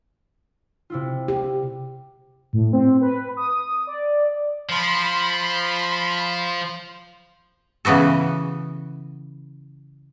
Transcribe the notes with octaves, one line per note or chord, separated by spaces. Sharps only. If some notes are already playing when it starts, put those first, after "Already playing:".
C3 E4 F4
G4
A2
C4
B4
D#6
D5
F3 B5 C6
C#3 E3 B3 F#4 A4